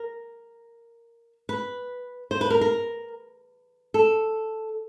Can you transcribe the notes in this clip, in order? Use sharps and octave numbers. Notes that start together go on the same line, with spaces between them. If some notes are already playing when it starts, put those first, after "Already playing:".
Already playing: A#4
B4
C5
B4
A#4
A#4
A4